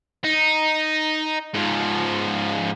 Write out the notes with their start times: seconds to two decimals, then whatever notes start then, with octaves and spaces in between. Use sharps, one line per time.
0.24 D#4
1.55 G#2 F3